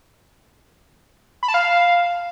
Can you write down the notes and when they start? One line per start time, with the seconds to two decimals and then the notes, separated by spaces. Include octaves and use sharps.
1.43 B5
1.48 A5
1.54 F5